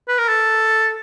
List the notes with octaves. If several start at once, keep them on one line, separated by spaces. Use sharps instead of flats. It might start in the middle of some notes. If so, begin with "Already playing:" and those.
B4
A#4
A4